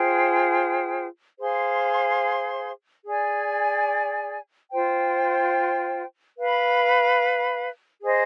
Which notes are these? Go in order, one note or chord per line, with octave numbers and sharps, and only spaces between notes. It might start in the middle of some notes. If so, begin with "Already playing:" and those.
Already playing: F4 G#4 C5 G5
G#4 C5 F5 C6
G#4 D5 G#5
F4 C5 G5
B4 F5 B5
G#4 C5 D#5